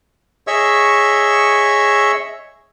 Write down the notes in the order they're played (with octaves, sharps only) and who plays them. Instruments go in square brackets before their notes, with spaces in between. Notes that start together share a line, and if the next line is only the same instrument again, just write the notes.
[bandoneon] G#4 C#5 D#5 E5 C#6 E6